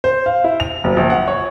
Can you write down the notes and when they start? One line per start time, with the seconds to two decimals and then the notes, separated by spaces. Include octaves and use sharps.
0.04 C5
0.26 F5
0.44 E4
0.60 F7
0.84 F#1
0.97 A#1
1.10 F#5
1.28 C#5